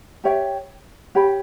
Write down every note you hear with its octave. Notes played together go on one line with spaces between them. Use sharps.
G4 C#5 E5 G5
G4 C#5 G5 B5